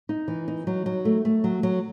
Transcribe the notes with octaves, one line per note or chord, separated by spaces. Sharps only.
D#4
E3
D#4
F#3
F#3
A3
A3
F#3
F#3